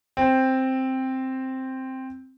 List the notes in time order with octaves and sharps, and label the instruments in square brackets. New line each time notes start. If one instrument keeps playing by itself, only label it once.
[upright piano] C4 C5